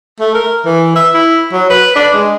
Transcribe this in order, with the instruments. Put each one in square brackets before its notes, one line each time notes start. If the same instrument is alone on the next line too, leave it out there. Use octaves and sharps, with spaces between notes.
[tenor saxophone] A3
A#4
E3
E5
E4
F#3
B4
D4
G#3